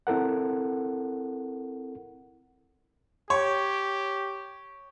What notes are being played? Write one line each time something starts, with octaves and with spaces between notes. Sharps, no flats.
C4 E4 A4 A#4 F#5
G4 C#5